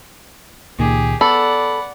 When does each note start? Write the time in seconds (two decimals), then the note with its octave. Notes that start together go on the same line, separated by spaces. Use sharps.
0.79 C#2 A#2 D#3 G4 G#4
1.21 B3 A4 D5 F#5 B5